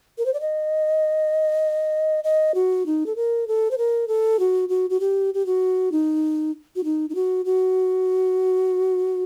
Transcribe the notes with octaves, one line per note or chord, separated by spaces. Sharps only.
A#4
C5
D5
D#5
D#5
F#4
D#4
A4
A#4
A4
C5
A#4
A4
F#4
F#4
F#4
G4
G4
F#4
D#4
F#4
D#4
D#4
F#4
F#4